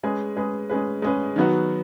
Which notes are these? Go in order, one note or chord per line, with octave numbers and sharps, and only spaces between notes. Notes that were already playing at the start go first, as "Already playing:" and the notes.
G#3 C#4 G#4 B4
G#3 C#4 G#4 B4
G#3 C#4 G#4 B4
G#3 C#4 G#4 B4
D#3 F#3 B3 F#4